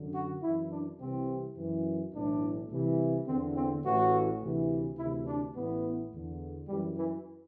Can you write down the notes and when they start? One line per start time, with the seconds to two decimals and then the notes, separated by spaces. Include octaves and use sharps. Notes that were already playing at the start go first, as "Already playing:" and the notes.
Already playing: F#2 D3
0.14 F#4
0.43 F#2 E3 E4
0.71 D4
0.99 C2 C3 E3 C4
1.56 F#2 E3
2.13 B1 A2 E3 D4
2.70 C2 C3 E3
3.26 E2 D3 C4
3.55 C4
3.84 A1 A2 E3 F#4
4.41 D2 C3 E3
4.97 D2 C3 E3 E4
5.26 D4
5.54 A1 A2 E3 B3
6.12 E2 D3
6.68 F#2 E3 G3
6.97 E3